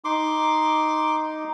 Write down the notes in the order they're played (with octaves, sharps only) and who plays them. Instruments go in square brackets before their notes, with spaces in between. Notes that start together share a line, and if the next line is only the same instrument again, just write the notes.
[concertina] D#4 [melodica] C6 D6